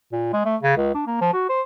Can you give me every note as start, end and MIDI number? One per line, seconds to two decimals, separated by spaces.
0.13 0.29 46
0.33 0.42 56
0.46 0.57 57
0.63 0.76 49
0.77 0.93 37
0.95 1.06 62
1.07 1.18 58
1.21 1.33 53
1.34 1.48 66
1.49 1.62 72